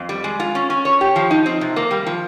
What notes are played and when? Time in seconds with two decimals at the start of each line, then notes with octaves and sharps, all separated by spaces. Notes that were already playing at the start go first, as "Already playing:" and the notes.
Already playing: F2
0.09 G3
0.24 G#3
0.40 F4
0.55 C#4
0.70 C#4
0.85 C#5
1.01 G4
1.16 F3
1.31 D#4
1.46 C4
1.61 C3
1.76 A#3
1.91 G3
2.07 F3